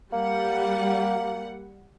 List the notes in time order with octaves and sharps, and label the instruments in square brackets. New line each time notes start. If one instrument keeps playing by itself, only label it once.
[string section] G3 F#5 [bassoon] A#3